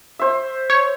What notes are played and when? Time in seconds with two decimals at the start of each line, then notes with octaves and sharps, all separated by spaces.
0.19 C5 E5
0.70 C#5